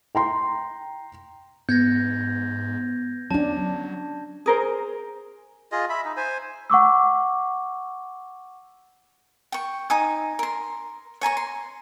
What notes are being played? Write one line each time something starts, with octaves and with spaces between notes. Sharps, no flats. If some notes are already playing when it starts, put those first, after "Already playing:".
G5 A#5 C6
G#2 B3 G6 G#6 A#6
F#3 C#4 D4 A5
G#4 A#4 C5
F4 G#4 D#5
E5 B5
D#4
C5 G#5
F#5 C#6 D6 E6
G5 C#6
D#4 G#5 D#6
A#4 C6
C#5 G#5 A#5 C#6
C6